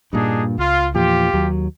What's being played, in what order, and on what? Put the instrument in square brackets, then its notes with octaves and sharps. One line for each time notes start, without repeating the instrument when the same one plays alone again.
[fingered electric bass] G2 A#2 [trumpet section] D4 D#4 G#4
[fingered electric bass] C#2 [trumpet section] F4
[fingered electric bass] E2 A#2 F3 [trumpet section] F4 G4
[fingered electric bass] D#2 F#3